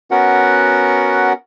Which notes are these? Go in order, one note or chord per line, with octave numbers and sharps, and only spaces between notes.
B3 C#4 F#4 A#4 F#5